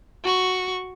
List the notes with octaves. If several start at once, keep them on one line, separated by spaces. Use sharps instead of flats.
F#4 C#6